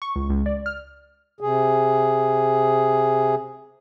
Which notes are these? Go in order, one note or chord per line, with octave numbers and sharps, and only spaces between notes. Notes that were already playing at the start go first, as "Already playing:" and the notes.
C#6
C#2
C#2
D5
F6
C3 G#4